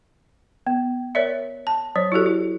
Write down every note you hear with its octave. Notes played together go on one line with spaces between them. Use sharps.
B3
A#4 C#5 D5 E5
A5
F#3 C5 C#5
E4 F#4 G4 A4
E4